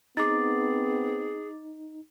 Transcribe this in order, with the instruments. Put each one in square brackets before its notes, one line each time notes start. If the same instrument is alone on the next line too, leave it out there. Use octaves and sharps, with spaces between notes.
[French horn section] B3 C4 [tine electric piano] D#4 [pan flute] G#4 [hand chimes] D6 A6